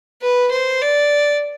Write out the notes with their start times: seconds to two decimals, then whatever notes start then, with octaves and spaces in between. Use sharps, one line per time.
0.22 B4
0.51 C5
0.81 D5